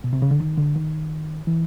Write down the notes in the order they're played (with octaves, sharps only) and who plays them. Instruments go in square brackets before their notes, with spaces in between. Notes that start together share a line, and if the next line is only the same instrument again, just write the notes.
[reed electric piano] B2
C3
C#3
D3
D#3
D3
D#3
E3